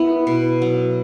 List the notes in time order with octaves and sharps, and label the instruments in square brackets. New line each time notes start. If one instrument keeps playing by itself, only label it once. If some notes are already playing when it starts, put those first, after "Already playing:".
Already playing: [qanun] B3 [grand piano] E4
[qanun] B2
F#3